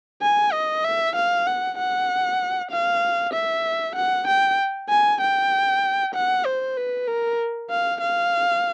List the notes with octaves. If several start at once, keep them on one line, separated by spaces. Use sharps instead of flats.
G#5
D#5
E5
F5
F#5
F#5
F5
E5
F#5
G5
G#5
G5
F#5
C5
B4
A#4
F5
F5